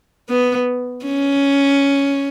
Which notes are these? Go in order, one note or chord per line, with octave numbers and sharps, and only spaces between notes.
B3
C#4